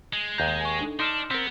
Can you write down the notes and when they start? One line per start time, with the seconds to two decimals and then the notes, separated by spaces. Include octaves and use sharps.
0.13 G#3
0.38 D#2 A#5 G6
0.61 G#5 C#6
0.81 D4 D#4 A4
1.00 D4 D#4 C6 F6 E7
1.31 B3 C4 A#4